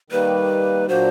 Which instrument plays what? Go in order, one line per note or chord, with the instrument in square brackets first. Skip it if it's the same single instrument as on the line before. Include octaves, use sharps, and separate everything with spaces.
[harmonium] D#3 G3 A#3 [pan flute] B4
[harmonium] A#2 F#3 A#3 D4 F#4 [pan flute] C5